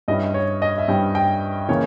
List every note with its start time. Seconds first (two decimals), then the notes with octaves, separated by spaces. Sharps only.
0.08 G2 G3 C#4 E4 D#5
0.34 C#5
0.62 D#5
0.78 E5
0.88 G2 G3 C#4 E4 G5
1.15 G5
1.69 C#3 E3 A#3 C#4 C#5